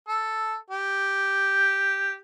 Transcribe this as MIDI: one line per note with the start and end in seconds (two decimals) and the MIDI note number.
0.08 0.56 69
0.70 2.19 67